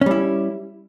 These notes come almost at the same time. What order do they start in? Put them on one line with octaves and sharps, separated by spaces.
C#4 G3 E4